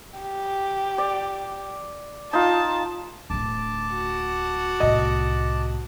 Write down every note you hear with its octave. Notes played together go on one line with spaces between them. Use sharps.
G4
D5
D#4 F4 A5
D1 D2 A5 D6
F#4
C2 A2 D#5